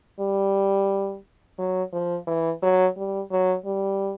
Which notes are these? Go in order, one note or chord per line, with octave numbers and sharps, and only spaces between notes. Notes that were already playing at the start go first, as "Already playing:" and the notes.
G3
F#3
F3
E3
F#3
G3
F#3
G3